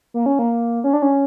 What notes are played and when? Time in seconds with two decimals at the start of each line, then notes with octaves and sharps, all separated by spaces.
0.14 A#3
0.26 C#4
0.39 A#3
0.84 C#4
0.93 D4
1.02 C#4